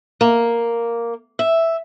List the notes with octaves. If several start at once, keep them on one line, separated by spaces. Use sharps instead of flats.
A#3
E5